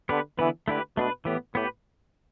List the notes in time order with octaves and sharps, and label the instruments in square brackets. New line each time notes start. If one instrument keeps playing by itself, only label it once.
[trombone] D3 [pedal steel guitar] B3 G4 B4
[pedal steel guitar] D3 B3 E4 B4 [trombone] E3
[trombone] D3 [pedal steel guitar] A3 E4 G4 B4
[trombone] B2 [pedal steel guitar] A3 D4 B4
[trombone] A2 [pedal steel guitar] E3 B3 G4
[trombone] A2 [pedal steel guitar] B3 G4 B4